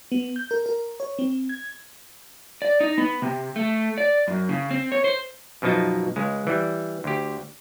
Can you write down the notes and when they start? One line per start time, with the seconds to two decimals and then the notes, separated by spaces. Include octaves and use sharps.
0.12 B3
0.36 G6
0.51 A#4
0.66 A#4
1.00 C#5
1.19 C4
1.49 G#6
2.62 D5
2.80 D#4
2.98 B3
3.22 C3
3.56 A3
3.98 D5
4.28 F#2
4.49 C#3
4.71 C4
4.92 C#5
5.04 C5
5.62 F#2 B2 F3 D#4 A5
6.16 C#2 G#3
6.47 E3 G3
7.04 D2 G4